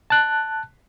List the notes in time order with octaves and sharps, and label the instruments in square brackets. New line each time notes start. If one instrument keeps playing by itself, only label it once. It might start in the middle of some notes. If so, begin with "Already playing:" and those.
[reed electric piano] A5 F#6